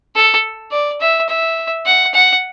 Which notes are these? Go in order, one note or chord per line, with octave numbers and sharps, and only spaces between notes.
A4
D5
E5
E5
F#5
F#5